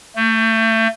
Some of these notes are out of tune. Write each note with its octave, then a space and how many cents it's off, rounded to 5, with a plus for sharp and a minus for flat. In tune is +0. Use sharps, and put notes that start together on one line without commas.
A3 +30